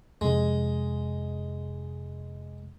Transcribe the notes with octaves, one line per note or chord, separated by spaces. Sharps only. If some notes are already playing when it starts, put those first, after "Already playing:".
F2 C3 G#3